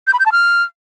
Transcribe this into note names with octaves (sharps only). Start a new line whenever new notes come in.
G6
B5
G6
A5
F6